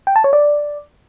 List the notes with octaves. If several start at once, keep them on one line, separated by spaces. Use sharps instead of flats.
G5
A5
C#5
D5